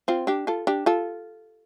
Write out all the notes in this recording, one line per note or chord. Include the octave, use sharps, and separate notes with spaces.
C4 F4
D4 G4
F4 A4
D4 G4
F4 A4